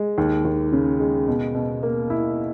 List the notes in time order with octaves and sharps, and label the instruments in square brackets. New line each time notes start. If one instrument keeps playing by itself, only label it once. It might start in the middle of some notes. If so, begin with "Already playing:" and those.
Already playing: [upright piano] G#3
D#2
D#2
C#3
G#3
B2
B2
A#3
E4